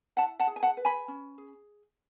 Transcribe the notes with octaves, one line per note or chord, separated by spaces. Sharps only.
E4 F#5 A5
F#5 A5
G#4
G#5
F#5 A5
B4
G#5 B5
C#4
G#4